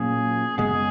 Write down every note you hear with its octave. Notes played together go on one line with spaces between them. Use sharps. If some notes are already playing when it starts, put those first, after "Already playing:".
Already playing: A#2 F#3 A#3 C#4 G#4
F#2 C#3 G#3 B3 G#4